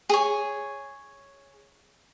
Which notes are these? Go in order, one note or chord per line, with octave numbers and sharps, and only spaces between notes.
G#4 C#5